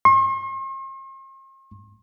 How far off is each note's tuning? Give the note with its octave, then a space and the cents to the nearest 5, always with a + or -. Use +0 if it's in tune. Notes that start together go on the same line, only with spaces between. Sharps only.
C6 +45